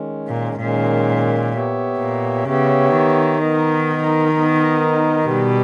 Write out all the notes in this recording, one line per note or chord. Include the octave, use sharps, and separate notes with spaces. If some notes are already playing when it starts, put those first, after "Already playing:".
Already playing: D#3 G#3 C#4
A#2
A#2 D#3 G#3 C#4
B3 G4 C#5 E5
A#2
C#3 B3 G4 C#5 E5
D#3
B3 D#4 A#4 D#5
B3 D#4 A#4 D#5
B2 G3 B3 G4 B4